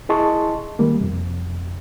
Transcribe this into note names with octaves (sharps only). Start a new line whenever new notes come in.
E4 G#4 D#5 A5 C6 C#6
D#3 G3 A#3
F2 C3